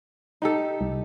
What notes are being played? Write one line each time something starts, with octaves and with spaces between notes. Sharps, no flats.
D#4 G4 A4
C2